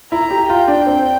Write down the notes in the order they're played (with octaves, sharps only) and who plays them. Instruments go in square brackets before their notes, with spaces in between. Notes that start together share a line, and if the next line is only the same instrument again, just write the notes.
[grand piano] E4 [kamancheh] A#5
[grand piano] G4
[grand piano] F4 [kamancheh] G5
[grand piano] D4
C4